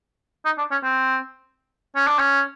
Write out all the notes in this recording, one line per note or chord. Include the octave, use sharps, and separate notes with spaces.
D#4
D4
C#4
C4
C#4
D4
C#4